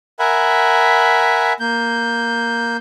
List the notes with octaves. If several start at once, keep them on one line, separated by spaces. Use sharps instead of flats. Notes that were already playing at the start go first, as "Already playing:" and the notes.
A#4 E5 F#5 G#5 B5
A#3 G6